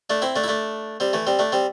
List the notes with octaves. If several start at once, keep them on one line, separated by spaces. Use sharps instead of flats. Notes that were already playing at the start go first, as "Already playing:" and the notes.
A3 D4
C4 E4
A3 D4
E4
A3 D4
G3 C4
E3 A3
G3 C4
A3 D4
G3 C4